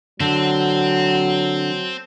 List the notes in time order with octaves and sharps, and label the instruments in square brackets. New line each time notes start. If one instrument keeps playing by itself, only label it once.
[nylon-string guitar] D3 [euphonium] F#3 [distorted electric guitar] C4